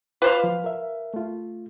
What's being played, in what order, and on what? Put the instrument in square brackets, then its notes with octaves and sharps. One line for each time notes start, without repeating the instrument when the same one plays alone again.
[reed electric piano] F4 G5 D6 [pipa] B4 C5 F5
[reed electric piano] F3
A#4 E5
A3 F4